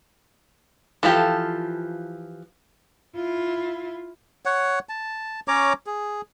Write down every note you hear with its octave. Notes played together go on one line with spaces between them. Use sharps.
E3 F3 F4 G4 A4
E4 F4
C#5 F#5
A5
C#4 C#5 A#5 D6
G#4